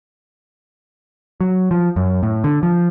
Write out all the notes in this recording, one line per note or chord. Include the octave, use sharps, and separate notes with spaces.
F#3
F3
F#2
A2
D3
F3